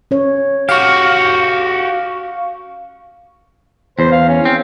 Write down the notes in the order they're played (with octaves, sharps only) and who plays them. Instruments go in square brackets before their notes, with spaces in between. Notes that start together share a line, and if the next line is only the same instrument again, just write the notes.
[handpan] C#4 C#5
[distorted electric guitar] F#4 G4 [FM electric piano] F5 C#6
[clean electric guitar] E2 [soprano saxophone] C5
[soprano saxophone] F5
C#4
[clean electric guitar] C4